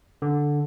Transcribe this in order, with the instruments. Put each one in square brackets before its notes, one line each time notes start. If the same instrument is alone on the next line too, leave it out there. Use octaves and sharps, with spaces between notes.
[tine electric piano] D3